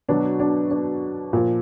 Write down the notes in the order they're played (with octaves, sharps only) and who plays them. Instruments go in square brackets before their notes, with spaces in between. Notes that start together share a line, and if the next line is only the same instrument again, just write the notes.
[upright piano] B2 F#3 D4
D4
D4
A#2 F3